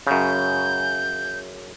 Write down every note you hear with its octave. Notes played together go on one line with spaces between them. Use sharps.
F#2 C#3 G6